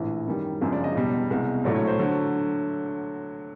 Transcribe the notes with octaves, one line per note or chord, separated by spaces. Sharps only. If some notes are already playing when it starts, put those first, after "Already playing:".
Already playing: A#1 A2 E3
F#2 D#3 G3
G1 F#2 C#3 F3 G#3
D5
D#5
E1 E2 B2 G3
C2 B2 G#3
A#1 A2 F#3 A3 D5
C#5
C5
D3 F#3